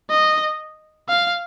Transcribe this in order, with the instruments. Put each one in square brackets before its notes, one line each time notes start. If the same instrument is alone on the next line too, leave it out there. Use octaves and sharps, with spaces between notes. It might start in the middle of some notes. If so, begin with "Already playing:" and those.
[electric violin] D#5
F5